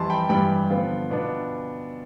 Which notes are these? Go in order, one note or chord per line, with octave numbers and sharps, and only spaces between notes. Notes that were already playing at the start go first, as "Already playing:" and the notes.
Already playing: F2 E3 G3 A5 C6
G5 B5
G2 E3 G3 G5 B5
D3 F3 B3 F4
B2 B3 D4 F4